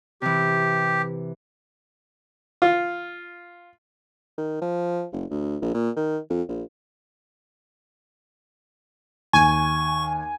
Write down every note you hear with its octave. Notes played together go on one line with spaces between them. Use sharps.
C3 E3 G4
F4
D#3
F3
F#1
D2
A#1
A#2
D#3
F2
A#1
D#2 G#5 C#6